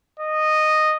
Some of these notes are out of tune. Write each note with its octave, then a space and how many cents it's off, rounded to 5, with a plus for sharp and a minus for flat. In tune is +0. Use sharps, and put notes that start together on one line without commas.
D#5 -10